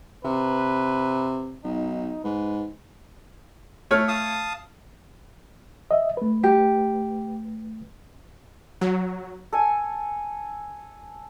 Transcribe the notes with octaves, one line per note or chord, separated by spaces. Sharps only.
C3 B4
B1 D#4
G#2 B4
A3 C#5 F6
F5 A5 D#6
D#5 E5
A3 B4
G4
F#3
A4 G#5